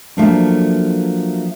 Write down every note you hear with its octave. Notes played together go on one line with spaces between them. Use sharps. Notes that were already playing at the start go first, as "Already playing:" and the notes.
F3 F#3 A3 A#3 D4